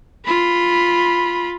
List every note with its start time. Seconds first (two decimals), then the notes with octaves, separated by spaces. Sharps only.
0.25 F4 B5